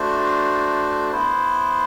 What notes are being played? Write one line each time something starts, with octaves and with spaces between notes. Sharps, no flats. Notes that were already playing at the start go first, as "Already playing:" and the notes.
Already playing: A3 D4 F#4 C5
B3 E4 C5